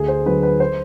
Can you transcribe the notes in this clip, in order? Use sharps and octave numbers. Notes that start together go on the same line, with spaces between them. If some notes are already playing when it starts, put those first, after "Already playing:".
Already playing: D2 G#4
C5
D3 F#3 B4
B4
C5